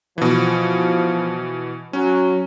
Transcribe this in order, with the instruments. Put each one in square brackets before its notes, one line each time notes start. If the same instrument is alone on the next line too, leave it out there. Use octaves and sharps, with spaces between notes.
[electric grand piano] B2 E3 [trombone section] F3
[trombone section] F#3 [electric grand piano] C#4